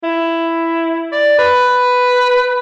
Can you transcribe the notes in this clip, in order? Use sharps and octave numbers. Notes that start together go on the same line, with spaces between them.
E4
D5
B4